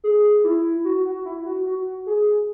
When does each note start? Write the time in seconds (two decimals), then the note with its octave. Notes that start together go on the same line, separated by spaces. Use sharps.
0.04 G#4
0.44 E4
0.85 F#4
1.05 F#4
1.25 E4
1.45 F#4
1.66 F#4
2.06 G#4